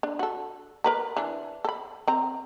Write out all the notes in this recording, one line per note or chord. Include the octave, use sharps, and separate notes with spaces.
D4
F#4 A4
A#4 B4 A#5
E3 D4
A4 B5
C4 A#5